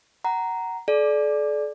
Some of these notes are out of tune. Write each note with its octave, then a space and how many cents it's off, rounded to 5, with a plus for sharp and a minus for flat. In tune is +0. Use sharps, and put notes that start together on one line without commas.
F#5 +20 A#5 +0
A4 -45 D5 +0